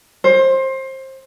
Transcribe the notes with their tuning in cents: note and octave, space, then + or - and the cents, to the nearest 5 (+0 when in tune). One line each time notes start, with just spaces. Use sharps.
C5 +25